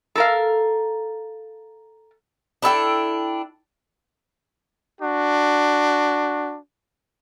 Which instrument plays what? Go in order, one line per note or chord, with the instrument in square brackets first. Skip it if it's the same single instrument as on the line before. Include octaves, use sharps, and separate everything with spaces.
[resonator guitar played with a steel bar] A4 A#4 F5
[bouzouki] D4 E4 A4 G5
[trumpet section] D4 F#4